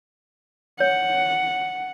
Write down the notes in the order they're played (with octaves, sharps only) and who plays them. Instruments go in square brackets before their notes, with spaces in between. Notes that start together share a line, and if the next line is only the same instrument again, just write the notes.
[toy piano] C#5 [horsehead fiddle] F#5